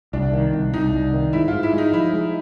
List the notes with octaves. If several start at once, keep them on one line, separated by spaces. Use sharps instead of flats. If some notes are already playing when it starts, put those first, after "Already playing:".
C2 D4
D#3
C2
C2 D#4
C2
D#3
G#2 E4
G#2 F4
E4
G#3 D#4
F3 E4
G#3